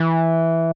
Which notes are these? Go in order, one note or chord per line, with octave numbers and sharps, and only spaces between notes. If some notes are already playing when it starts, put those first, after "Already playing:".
Already playing: E3